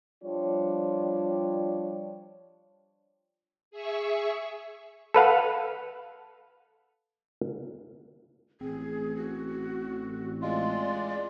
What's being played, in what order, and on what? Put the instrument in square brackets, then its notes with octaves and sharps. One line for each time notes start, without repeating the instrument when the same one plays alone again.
[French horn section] F3 G3 D4 F4 C#5 D5
[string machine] G#4 E5 C#6
[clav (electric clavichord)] A4 B4 F5 F#5
[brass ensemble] A1 [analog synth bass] C4 [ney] G#4
[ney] F#4
[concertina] G#3 F4 [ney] D5